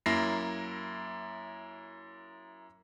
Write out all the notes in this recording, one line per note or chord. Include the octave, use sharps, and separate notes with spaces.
F#2 A#3 E4 A#6 C7